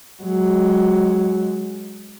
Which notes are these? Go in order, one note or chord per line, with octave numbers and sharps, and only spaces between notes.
F#3 G#3